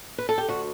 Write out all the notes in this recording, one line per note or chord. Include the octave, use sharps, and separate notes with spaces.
B4
A4
G4
D2 F#4